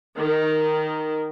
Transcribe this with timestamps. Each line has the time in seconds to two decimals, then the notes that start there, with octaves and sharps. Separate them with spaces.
0.18 D#3